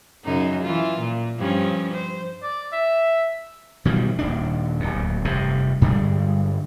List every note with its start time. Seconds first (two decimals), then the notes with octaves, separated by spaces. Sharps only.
0.24 F#2 C#3 D#4
0.62 E3 F4
0.98 A#2
1.38 G2 F3 C#4
1.93 C5
2.43 D5
2.73 E5
3.85 B2 D#3 F3 G3
4.19 D#1 D#2 D4
4.80 D1 D#2
5.25 F1 G2 C3
5.81 G2 D3 G3 G#3